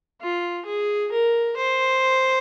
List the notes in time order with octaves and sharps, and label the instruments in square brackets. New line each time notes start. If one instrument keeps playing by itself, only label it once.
[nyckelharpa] F4
G#4
A#4
C5